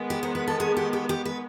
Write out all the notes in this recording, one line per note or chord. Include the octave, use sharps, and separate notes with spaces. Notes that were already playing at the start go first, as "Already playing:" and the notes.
Already playing: D#3 G#3 B3
G4
C5
B4
A4
G#4
G4
G4
G4
B4